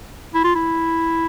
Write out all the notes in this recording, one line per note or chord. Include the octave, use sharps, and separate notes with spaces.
E4
F4
E4